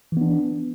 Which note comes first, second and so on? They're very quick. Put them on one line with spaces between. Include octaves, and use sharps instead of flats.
E3 B3 D4